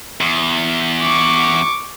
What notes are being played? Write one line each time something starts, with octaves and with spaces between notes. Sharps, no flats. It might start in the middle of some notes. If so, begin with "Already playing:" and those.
E2
C#6 D6